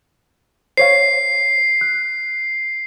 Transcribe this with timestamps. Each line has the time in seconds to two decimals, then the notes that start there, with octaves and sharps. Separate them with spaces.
0.77 C5 C#5 F5 C7
1.81 F#6